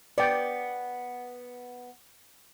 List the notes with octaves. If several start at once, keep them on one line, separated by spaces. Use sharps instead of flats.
B3 D5 G5